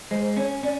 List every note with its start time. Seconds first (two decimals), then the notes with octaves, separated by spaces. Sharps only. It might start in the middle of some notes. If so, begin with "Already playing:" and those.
0.11 G#3 C5
0.37 C#4 C#5
0.63 C#4 D5